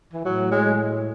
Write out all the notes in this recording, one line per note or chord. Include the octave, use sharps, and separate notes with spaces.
E3
A2 F#3
G#3